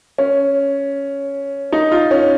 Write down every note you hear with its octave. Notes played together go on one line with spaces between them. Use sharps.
C#4
D#4
F4
C#4